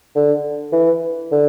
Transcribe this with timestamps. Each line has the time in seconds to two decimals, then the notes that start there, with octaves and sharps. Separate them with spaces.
0.15 D3
0.72 E3
1.31 D3